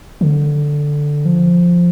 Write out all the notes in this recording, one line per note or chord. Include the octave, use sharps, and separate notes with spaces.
D3
F3